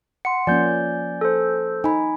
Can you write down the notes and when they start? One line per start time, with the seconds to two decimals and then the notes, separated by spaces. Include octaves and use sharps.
0.25 F#5 C6 C#7
0.47 F3 A#3 C#4 D5 G#5 G6
1.21 A4 C5
1.84 D#4 G#5 B5